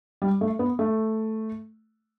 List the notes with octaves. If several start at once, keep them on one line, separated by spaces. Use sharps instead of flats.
G3
A3
B3
A3